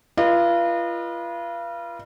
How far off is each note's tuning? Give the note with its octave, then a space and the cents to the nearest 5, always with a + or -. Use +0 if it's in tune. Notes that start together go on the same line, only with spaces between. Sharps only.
F4 -30 B4 -35 D#5 -40